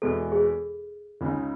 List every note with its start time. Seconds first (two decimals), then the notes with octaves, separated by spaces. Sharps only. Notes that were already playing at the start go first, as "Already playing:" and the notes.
0.02 E2 B2 G#3 A4
0.32 G#4
1.21 C#2 C#3 G#3 D#4